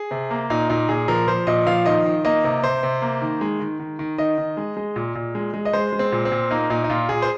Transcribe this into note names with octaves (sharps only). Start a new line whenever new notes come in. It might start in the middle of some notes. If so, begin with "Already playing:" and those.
Already playing: G#4
C3
A#3
A#2 D#4
A#2 D#4
A#2 G#4
F3 A#4
F3 C5
A#2 D#5
F3 F5
D#3 D#5
D#3
A#3 D#5
C3
C3 C5
C3
A#3
D#3
G#3
D#3
D#3
D#3
D#3 D#5
D#3
G#3
G#3
A#2
A#2
G#3
G#3
D#5
G#3 C5
G#3
C4
A#2
C4
A#2
A#3 D#4
A#2 D#4
D#4
A#2 F4
A#2 G#4
C5